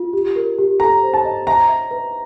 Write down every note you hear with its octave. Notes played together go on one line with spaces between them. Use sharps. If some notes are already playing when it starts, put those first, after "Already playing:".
Already playing: F4
G4
A#4
G4
A4 A#5
C5
A5
D#5
E5 A#5
E5
B4